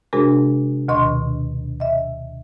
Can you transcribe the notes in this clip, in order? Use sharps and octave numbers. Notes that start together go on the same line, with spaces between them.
C3 G#3 D4 F#4 G#4 A#4
D2 B2 D#3 D#5 C6 C#6
D#5 E5